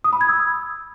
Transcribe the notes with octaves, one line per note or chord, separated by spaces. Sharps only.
D#6
B5
G#6
E6